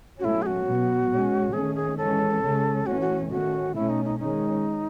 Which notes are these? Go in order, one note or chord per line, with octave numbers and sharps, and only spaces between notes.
B2 F#3 A3 C#4 E4 F#4
G#4
F#4
B2 F#3 B3
B2 G#3 C#4
D#3 A3 C#4 G#4
G#4
E3 G#3 C#4 A4
C#3 G#3 C#4
E3 A3 C#4 F#4
F#4
D#3 A3 C#4 F#4
B2 A3 C#4 E4
D#4
D#4
D#3 G#3 C#4 D#4